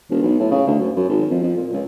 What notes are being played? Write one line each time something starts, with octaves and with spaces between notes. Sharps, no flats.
E1
B1
A2
C#3
D2
F#2
F#2
G#1
F2
F2
A#2
C#2